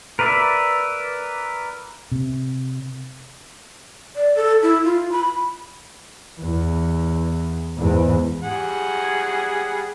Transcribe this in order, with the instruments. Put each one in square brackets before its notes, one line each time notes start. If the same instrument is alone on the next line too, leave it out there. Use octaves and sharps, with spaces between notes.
[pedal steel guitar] A#4 B4 D5 E5
[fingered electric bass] C3
[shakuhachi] D5
A4
E4
F4
B5
[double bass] E2
E2 G#2
[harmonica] G3 G#4 F#5